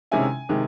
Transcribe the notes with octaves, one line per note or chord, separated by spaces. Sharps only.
C3 D#3 G#3 C#4 E4 G#5
C3 D#3 G#3